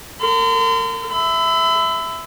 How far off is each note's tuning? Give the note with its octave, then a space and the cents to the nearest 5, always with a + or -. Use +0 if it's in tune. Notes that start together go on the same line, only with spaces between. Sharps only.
A#4 -35 C6 -40
E5 +0 B5 +35